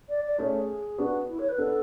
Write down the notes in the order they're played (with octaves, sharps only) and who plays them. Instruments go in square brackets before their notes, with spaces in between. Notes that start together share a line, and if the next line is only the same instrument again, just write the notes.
[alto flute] D5
D5
[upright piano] A3 C#4 [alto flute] G#4
[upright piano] B3 D4 [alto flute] F#4
[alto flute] E4
C#5
B4
[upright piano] B3 D4 [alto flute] A4